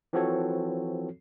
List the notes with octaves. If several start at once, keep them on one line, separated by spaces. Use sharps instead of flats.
E3 F3 C4 F#4 A4 C#5